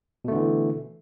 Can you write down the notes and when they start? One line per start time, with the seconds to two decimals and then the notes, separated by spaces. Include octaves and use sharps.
0.25 B2
0.28 A3
0.32 D3
0.35 E3